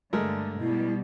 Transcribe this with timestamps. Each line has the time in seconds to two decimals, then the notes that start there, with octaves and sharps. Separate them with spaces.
0.13 G2 D3 G#3 A3 A#4
0.60 B2 G3 E4